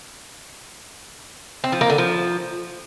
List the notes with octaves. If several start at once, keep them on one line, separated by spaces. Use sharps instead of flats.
C4
F3
A#3
D3
F3